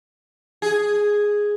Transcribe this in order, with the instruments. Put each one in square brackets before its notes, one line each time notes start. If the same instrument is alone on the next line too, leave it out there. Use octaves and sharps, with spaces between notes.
[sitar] G#4